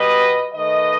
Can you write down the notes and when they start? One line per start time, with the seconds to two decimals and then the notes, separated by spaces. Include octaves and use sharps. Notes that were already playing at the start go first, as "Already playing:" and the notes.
Already playing: B2 G3 B3 B4 D#5
0.54 D#3 A3 B4 D#5